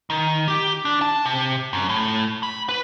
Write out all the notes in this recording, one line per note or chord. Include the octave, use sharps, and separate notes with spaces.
D#3
G4
D4
A5
C3
F#2
A2
B5
B4